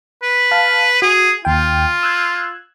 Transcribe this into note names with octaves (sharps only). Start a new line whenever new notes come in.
B4
F5 A5
F#4 G#4
D#2 F4 G5
E6 F#6 G#6